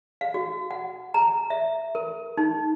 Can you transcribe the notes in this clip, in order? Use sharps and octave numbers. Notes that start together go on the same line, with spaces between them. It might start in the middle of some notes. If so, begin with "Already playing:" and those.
F5
F#4
F#5
A#5
E5
A#4
D#4